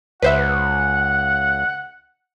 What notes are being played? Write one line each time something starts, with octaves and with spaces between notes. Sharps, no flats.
C#2 B4 C5 E5 F#5